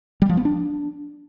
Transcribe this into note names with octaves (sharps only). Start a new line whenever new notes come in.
G3
F3
B3
D4